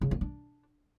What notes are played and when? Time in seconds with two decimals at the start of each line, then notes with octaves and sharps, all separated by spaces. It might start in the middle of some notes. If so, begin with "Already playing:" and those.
0.01 C#3
0.11 A#3
0.21 D4